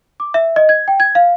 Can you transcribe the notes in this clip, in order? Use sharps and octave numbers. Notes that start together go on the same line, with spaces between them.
D6
E5
D#5
G#6
G5
G#6
F5